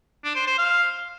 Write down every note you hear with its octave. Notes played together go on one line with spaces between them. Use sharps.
D4
C5
C5
F5